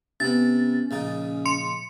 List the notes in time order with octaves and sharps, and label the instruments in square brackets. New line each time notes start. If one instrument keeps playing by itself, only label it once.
[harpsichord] C3 B3 [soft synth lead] C#4 [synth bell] A6
[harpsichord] A#1 C#3 D#4
[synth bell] C6 C#7